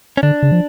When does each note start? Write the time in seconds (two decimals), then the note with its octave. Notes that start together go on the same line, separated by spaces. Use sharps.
0.17 C#4
0.23 D3 D4
0.43 C#3
0.52 F3